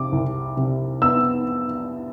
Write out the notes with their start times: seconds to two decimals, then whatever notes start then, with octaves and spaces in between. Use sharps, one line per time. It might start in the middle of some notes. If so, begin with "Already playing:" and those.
Already playing: C3 D6
0.12 C2
0.57 C3
1.02 B3 E6